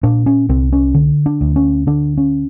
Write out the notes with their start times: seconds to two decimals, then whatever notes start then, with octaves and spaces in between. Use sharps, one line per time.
0.03 A#2 D4
0.26 C#4
0.49 C2 C4
0.73 C#4
0.94 D3
1.26 D4
1.41 D2
1.56 C#4
1.87 D3 D4
2.18 C#4